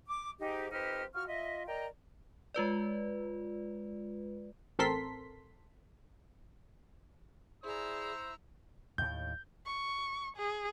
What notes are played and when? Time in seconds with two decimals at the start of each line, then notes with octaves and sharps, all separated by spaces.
0.08 D6
0.40 G#2 D#4 G4
0.72 F2 C4 D#4 G4 B4 F6
1.15 F4 F#4 C#6 F6
1.28 F4 D#5 E5
1.67 A#4 D5 D#5 G5 A#5
2.54 G#3 F4 B4 D5
4.79 A1 C4 A4 A#4 C6 B6
7.64 E4 G#4 C5 D5 A#5 E6
8.98 D#2 A2 G6
9.65 C#6
10.37 G#4